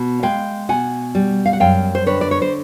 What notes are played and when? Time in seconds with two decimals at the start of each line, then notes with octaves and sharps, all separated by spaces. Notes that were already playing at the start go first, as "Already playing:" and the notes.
Already playing: B2
0.23 G#3 F5 G5
0.69 B2 F#5 G#5
1.15 G3
1.46 F5
1.53 F#5
1.60 F#2 F5 G5
1.95 C5
2.06 D3 B4 C#5
2.21 D5
2.31 C#5
2.42 C5